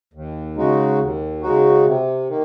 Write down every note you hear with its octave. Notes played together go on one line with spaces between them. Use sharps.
D#2
C#3 G#3 D#4 F#4
D#2
C#3 G#3 D#4 F#4
C3
D#3 A#3